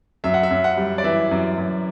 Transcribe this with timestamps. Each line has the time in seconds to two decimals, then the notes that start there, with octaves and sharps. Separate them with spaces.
0.24 F#2 E5
0.34 F#5
0.43 E5
0.51 F#2
0.64 F#5
0.77 G3
0.98 D5
1.04 E3 E5
1.31 F#2
1.58 F#2